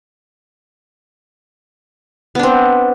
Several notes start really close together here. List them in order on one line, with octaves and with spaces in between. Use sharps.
B3 D4 C4